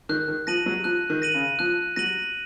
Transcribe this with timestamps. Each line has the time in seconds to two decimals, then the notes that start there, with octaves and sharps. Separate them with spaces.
0.09 D#3 F#6
0.28 D#3
0.47 F3 A#6 D#7 F#7
0.66 F#3
0.84 F3 F#6
1.10 D#3
1.22 A#6 D#7 F#7
1.34 C#3
1.59 F3 F#6
1.96 F#3 A#6 D#7 F#7